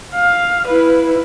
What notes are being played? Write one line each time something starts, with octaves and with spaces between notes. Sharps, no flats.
F5
E4 B4